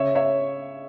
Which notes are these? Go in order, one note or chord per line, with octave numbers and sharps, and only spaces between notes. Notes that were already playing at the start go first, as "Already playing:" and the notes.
Already playing: C#3 C#5 E5
C#5 E5